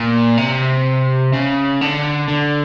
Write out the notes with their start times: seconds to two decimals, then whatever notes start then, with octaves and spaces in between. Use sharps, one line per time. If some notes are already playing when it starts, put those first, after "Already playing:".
Already playing: A#2
0.38 C3
1.33 C#3
1.81 D3
2.28 D3